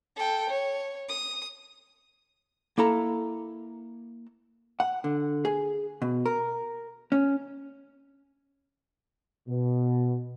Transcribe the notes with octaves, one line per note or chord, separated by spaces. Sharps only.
A4 G5
C#5
D#6
A#3 E4 A4 A#5
F#5
D3
G#4
B2
A#4
C#4
B2